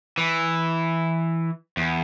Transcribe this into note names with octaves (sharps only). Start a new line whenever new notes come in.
E3
E2